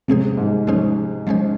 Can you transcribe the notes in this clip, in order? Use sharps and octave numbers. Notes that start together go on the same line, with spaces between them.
C3 F3 G#3 C#4 G#4 C5
G#2
F3 G#3 C#4 G#4 C5
F3 G#3 C#4 G#4 C5